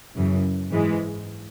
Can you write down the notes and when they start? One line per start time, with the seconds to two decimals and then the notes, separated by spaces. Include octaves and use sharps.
0.15 F#2 C#3 E3
0.71 G#2 E3 G#3